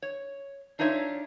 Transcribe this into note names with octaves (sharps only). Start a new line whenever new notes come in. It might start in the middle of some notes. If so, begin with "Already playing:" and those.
C#5
D4 D#4 F4 C#5 D5 E5